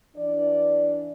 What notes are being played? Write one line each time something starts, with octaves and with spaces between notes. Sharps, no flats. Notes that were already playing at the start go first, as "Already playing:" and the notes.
E3 D4 D5